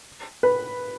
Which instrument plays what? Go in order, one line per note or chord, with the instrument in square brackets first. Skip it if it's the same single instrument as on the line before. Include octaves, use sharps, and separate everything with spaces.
[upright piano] B4